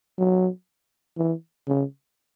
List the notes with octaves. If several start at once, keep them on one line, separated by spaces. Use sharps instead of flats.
F#3
E3
C#3